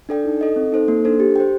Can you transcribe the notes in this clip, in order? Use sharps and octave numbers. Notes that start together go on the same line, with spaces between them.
D4 A4 D5 G5
D#4
A4 D#5
C4
D#4 A4 C5
A#3
D4 A4 C5
G4
C5 G5